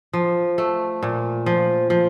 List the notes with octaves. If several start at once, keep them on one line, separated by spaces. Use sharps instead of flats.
F3
A3
A#2
F3
F3